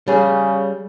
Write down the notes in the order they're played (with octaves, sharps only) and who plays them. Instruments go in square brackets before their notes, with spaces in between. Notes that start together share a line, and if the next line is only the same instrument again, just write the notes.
[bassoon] C#3 [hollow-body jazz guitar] G3 G#4